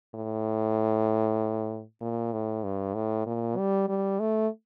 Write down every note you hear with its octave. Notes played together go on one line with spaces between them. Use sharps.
A2
A#2
A2
G2
A2
A#2
G3
G3
A3